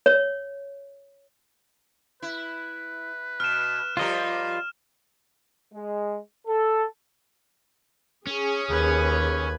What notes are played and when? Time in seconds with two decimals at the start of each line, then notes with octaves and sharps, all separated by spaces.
0.06 C#5
2.22 E4 B4
3.40 B2 F6 E7
3.97 F3 G3 F4 A#4 D#5
5.72 G#3
6.47 A4
8.27 C#4 G#4
8.71 D#2 B4 G#6